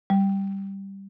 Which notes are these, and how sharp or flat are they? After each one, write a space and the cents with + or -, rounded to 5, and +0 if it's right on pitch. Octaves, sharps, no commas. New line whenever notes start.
G3 +0